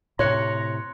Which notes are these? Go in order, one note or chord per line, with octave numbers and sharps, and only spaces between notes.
A2 C3 C#5 A#5 C6 F#6 C#7